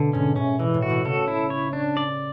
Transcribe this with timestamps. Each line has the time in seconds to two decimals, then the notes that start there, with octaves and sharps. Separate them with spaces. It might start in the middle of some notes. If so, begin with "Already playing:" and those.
Already playing: B2 D3
0.13 G#2 C#4
0.36 A2 C#4
0.59 B2 E3
0.74 A2
0.82 F#4
0.90 B2
1.05 C#3 A4
1.28 E4
1.50 C#5
1.73 D4
1.97 D5